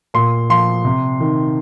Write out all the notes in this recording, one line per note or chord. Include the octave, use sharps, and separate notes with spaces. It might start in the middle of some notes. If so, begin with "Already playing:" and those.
A#2 C6
F3 C6
C3
D#3